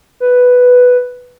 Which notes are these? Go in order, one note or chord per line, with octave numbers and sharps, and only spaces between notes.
B4